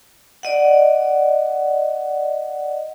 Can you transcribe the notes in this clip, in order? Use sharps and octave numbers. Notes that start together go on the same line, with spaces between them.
D5 D#5 F#5